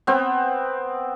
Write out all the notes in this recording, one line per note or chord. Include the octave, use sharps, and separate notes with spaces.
B3 C4 G5